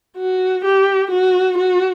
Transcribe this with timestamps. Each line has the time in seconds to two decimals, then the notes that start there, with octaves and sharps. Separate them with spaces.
0.17 F#4
0.65 G4
1.11 F#4
1.58 F#4